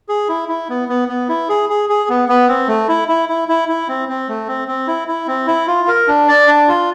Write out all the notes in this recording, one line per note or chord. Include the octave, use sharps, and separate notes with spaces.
G#4
E4
E4
B3
B3
B3
E4
G#4
G#4
G#4
B3
B3
C4
A3
E4
E4
E4
E4
E4
C4
C4
A3
C4
C4
E4
E4
C4
E4
F4
A#4
D4
D5
D4
F4